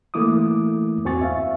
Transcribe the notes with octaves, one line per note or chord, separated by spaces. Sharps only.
E3 A3 A#3 E4 D6 D#6
E2 C4 F#4 G#5 C#6 A6
E5 F5